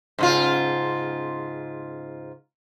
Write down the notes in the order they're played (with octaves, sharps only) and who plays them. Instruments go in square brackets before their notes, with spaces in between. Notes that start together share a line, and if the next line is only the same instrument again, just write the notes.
[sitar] G#2 C#3 F4